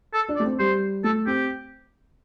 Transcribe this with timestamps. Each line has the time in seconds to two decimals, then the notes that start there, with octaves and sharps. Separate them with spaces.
0.14 A4
0.29 D4
0.36 D5
0.40 A3
0.44 C4
0.59 G3 C5
1.04 A3 A4
1.27 C4 G4